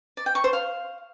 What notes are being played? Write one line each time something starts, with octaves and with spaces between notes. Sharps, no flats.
D5
G5
C#6
C5
F5